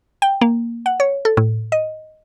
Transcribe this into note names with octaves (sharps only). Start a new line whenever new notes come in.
G5
A#3
F#5
C#5
A4
A2
D#5